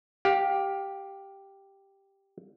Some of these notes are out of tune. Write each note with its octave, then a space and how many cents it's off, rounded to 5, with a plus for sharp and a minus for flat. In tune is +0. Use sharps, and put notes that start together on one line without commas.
G4 +0 F5 +25